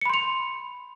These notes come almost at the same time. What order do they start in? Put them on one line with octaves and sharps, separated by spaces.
C#7 B5 C6 F7